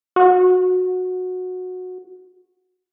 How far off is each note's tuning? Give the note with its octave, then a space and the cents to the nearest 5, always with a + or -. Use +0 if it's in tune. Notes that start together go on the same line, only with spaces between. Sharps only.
F#4 -15